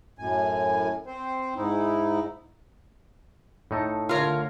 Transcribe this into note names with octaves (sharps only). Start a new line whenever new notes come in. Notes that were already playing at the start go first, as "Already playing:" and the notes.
F#2 A2 G#5
C4 C5
G#2 D#4 E4
A2 D#4 A4
D3 A3 F4 A#4 C#5